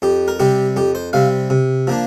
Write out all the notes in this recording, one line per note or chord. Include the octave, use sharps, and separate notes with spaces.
F2 G4
A#4
C3 G3 C4 G4
F2 G4
C5
C3 G3 C4 F5
C3
F3 A#3 D4